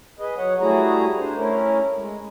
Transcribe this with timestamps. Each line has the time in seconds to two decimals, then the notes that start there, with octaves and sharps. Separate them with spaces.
0.19 G#4 B4 D#5
0.37 F#3 C#5 F#5
0.61 G3 A3 E4 F#4 G#4 A#5
1.18 D4 C5
1.36 A3 C#4 E4 A#4
1.97 G#3